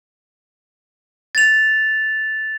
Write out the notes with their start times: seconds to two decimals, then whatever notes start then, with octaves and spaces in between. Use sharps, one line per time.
1.35 A6 F7